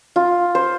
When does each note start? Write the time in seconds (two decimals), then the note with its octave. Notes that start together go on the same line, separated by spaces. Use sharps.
0.16 F4
0.55 C5